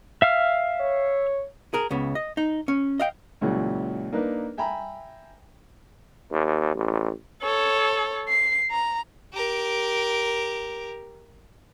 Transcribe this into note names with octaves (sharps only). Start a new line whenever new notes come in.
E5 F5 F6
C#5
G#4 A#4
C#2 C#3 B3
D#5
D#4
C#4
D#5 F5 G5
C#2 A#2 C#3 E3 F#3
A#3 D4 D#4 B4
E5 G5 G#5 A#5 B5
D#2
A1
A4 C#5
C7
A#5
G4 A#4